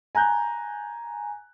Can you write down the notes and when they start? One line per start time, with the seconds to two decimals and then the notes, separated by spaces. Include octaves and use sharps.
0.15 G#5 A#5 F#6 G6